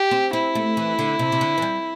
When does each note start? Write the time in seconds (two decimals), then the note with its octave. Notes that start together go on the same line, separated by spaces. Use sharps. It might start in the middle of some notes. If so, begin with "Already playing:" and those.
Already playing: G4
0.11 C4
0.33 C4 E4
0.55 A3
0.77 E3
0.99 D3
1.19 C3
1.32 C3
1.41 D3
1.58 E3
1.62 G3